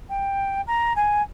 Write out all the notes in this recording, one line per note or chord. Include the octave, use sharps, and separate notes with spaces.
G5
A#5
G#5